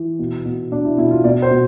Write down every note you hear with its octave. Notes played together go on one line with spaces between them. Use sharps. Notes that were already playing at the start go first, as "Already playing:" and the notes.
Already playing: E3
B2
B2
B2 D4
E4
B2 E4
F4
B2 D5
C5
B2